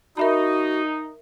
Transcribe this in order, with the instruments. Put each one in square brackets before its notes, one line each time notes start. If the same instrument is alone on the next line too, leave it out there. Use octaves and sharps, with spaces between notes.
[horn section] D#4 [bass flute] F#4 [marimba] A#4 E5 B5